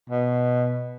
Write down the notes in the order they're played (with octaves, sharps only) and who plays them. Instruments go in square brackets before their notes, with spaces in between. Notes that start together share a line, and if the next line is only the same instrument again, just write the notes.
[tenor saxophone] B2